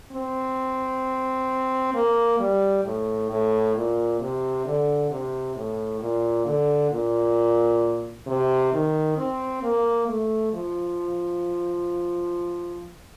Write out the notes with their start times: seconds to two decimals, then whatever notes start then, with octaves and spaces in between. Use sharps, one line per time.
0.12 C4
1.94 A#3
2.39 G3
2.84 A2
3.30 A2
3.75 A#2
4.20 C3
4.65 D3
5.11 C3
5.56 A2
6.01 A#2
6.46 D3
6.91 A#2
8.27 C3
8.72 D#3
9.17 C4
9.63 A#3
10.08 A3
10.53 F3